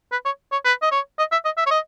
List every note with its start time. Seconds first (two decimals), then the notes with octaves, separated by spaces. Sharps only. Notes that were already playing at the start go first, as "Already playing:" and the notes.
0.12 B4
0.25 C#5
0.52 C#5
0.65 B4
0.82 D#5
0.91 C#5
1.19 D#5
1.32 E5
1.45 D#5
1.58 E5
1.66 C#5
1.71 D#5